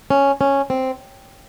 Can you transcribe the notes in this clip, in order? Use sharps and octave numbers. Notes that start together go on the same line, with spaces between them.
C#4
C#4
C4